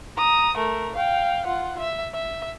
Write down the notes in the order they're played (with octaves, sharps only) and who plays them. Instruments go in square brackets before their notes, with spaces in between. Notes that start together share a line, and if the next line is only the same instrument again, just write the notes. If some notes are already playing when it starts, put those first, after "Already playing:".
[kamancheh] A#5 D#6
A3 A#4
F5 G5
F4 F#5
E5
E5